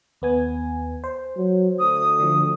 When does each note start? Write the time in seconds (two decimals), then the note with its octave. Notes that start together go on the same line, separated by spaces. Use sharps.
0.22 D#2 B3 G#5
1.04 C5
1.37 F#3
1.79 D2 D#6
2.20 D3 F3